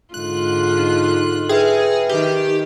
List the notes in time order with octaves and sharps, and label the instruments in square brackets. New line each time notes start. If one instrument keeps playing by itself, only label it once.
[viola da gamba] G#2 D3 F4 [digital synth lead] F#6
[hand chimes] D#4
[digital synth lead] G#4 [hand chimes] B4 E5 G5
[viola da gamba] D#3 [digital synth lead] G4